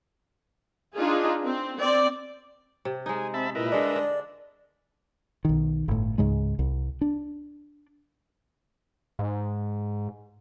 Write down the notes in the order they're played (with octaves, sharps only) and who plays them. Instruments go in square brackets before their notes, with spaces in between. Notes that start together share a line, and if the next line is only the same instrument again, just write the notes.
[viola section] D4 D#4 F4 G#4
C4
C4 D5
[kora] C3
[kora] G#3 D#4 [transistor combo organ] G#5
[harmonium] C4 [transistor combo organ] E5 A5 B5
[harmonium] A#2 E4 D#5 [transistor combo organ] A#4 B4 E5
[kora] D3 G#3 D4 [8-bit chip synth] D5 [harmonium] D#5
[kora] D4
[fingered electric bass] B1 D#3
G1 A2
C#2 G#2 C#3 G#3
C2
D4
[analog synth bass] G#2